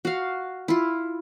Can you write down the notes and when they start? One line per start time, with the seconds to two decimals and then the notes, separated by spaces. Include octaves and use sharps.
0.05 F#4 F5
0.68 E4 F4